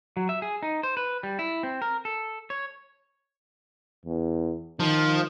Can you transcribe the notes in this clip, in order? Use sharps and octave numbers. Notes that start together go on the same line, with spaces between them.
F#3
E5
G#4
D#4
C5
B4
G3
E4
C4
A#4
A4
C#5
E2
D#3 F3